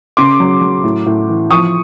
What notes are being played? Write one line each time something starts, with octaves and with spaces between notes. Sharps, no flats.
C#3 C6 D6
F#3
F#3
A2
A2
E3
F3 C#6 D#6